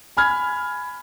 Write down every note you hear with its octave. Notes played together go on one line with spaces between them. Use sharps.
G#5 B5 F6 G#6